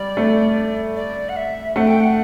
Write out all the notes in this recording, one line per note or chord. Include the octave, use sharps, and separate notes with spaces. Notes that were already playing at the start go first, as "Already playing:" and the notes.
Already playing: G3 D5
A3
D5
F#5
E5
A3 F#5
G5
F#5